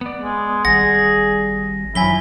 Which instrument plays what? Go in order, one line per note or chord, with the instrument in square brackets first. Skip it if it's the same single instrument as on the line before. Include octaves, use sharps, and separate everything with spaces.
[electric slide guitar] B3 D5
[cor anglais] G#3
[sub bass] G#1 [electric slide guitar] G3 F#5 [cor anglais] G#4 [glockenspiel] A#6
[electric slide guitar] F#2 D#3 F3 [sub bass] F#3 [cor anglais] E4 [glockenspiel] G#5 B6 G7